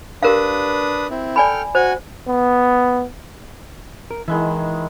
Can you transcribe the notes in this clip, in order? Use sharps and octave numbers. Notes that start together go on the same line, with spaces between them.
D4 G4 A#4 B4 F5 D#6
C4 E4
A4 D5 G5 G#5 B5 F6
F#4 C5 G#5
B3
A#4
D#3 E3 G#3 E4